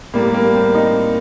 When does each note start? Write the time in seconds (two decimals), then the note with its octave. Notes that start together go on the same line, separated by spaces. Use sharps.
0.14 A2 G3 A#3
0.34 A#3
0.54 C4
0.75 D#4